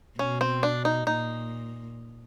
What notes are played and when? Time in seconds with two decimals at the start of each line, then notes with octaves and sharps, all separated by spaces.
0.18 B2 C#4
0.41 C4
0.63 D4
0.85 D#4
1.07 A#2 D#4